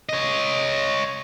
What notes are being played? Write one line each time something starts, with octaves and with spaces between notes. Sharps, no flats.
C#5 D#5